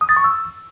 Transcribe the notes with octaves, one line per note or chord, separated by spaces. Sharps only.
D#6
A6
C#6
E6